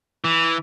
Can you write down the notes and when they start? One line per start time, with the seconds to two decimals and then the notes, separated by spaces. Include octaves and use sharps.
0.24 E3